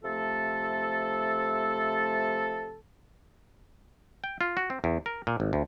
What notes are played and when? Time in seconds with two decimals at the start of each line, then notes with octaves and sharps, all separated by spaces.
0.03 C3 F3 A3 A4
4.24 G5
4.41 F4
4.57 F#4
4.70 C4
4.84 E2
5.06 A#4
5.27 A#2
5.40 G#1
5.53 D2